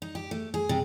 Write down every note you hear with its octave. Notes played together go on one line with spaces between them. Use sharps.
D#4
G4
A3
G#4
C3